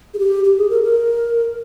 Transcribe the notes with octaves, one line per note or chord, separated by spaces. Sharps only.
G#4
G4
G4
G#4
A#4
A#4